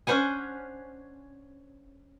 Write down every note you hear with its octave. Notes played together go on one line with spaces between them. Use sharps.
C#4 D4 C5 F#5 G#5